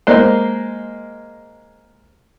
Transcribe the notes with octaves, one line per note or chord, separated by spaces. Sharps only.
G#3 A#3 C5